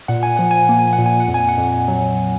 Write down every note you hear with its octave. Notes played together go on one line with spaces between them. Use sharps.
A#2 F#5
G#5
F3 F#5
G#5
A#3 F#5
G#5
F#5
A#2
G#5
F#5
F2
G#5
F#5
F2
F#3